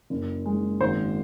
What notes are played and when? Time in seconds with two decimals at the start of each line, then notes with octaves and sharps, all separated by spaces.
0.10 F#1
0.46 G#3
0.80 G#1 C5